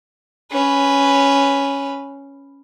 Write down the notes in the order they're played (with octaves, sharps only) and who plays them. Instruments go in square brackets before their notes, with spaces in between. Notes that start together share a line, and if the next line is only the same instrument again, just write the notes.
[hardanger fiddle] C#4 B4